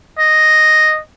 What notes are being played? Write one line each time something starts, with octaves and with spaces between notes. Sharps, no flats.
D#5